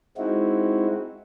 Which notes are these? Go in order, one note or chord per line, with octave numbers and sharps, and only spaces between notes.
G#3 C4 D#4 E4 F#4